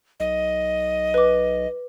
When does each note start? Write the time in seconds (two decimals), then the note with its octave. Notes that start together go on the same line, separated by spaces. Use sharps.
0.20 B1 D#5
1.14 B4 D6